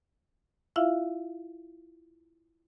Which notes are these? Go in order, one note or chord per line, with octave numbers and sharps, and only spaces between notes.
E4 F4 E5 F5